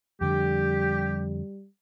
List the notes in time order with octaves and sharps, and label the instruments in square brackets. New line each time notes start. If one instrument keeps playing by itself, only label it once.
[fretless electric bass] F2 D3 [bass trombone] G3 [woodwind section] G4